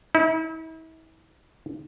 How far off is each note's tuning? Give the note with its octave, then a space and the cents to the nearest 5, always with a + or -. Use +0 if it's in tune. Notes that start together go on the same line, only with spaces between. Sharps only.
E4 -40